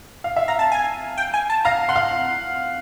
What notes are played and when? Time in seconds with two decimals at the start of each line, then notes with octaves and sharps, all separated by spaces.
0.24 F5
0.36 E5
0.48 F5 A#5
0.59 A5
0.72 G#5
1.17 G5
1.34 G#5
1.50 A5
1.65 F5 A#5
1.89 F#5 C6
1.96 F5